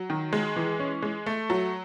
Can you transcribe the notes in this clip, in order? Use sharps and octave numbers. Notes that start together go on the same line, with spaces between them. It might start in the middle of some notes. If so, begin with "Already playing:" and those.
Already playing: F#3
D#3
G#3
E3
C#4
G#3
A3
F#3